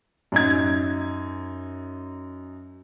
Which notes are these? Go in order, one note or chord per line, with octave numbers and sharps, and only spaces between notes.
F#2 D#4 G#6